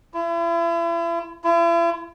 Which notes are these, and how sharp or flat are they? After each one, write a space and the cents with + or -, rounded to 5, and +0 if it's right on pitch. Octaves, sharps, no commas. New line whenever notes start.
E4 +40
E4 +45